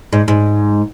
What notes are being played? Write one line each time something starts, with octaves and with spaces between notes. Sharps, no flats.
G#2
G#2